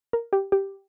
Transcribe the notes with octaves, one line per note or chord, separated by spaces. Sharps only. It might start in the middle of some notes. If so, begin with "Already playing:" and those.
A#4
G4
G4